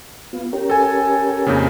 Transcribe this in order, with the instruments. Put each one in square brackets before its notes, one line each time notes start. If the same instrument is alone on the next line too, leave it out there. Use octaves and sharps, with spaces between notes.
[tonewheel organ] B3 F4
C#4 G4 A#4
[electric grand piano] A4 G#5
F2 A#2 C#3